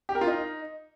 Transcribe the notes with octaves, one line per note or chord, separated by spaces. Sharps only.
G4
A#4
F4
D#4